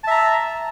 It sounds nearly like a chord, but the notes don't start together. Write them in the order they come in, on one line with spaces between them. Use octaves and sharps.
A5 E5 A#5